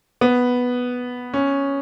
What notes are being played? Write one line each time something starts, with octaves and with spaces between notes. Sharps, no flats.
B3
C#4